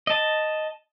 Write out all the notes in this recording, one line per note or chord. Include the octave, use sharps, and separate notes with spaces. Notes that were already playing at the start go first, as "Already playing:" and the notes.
D#5 A5